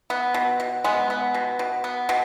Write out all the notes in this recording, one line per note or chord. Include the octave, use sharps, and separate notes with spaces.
B3
B2
B2
G#3 B3
B3
B2
B2
B3
B2